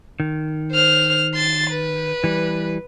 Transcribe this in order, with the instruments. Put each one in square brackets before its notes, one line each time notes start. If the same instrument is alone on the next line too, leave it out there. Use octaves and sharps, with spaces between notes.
[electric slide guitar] D#3
[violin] C5 F6
C6 A6
B4
[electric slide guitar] E3 G3